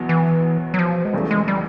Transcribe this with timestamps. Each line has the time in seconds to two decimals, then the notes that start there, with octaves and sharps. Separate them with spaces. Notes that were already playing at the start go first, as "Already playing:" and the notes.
Already playing: E2 B2 F#3 B3
0.09 E3
0.74 F#3
0.79 F3
1.05 G#3
1.13 F1 E2 C#3 E3 G3 A3
1.31 G#3
1.48 G3